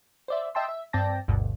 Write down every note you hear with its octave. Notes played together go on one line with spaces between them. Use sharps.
C5 D5 E5
D#5 E5 G5 A5 C6 E6
E5
G2 C4 D5 G5 A5 A#6
G1 D2 G2 B2